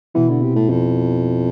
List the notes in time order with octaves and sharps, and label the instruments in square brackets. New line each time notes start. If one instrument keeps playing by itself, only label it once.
[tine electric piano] B2 B3 E4 [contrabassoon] E3
[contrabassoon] D3
C3
A2
F2